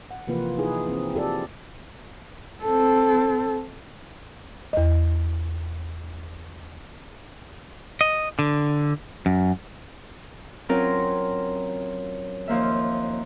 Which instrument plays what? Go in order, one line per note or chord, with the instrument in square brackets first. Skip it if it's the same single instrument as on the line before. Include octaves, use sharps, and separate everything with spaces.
[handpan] F#5
C3 E3 F3 A#3 F4 B4
D#4 E4 G#4 B4
C4
F4 G4 A4 D5
[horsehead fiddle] C4 A4
[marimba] E2 D#5
[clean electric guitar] D#5
D3
F#2
[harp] F#3 C4 C#4 F4 A#4
D#2 F3 A#3 E5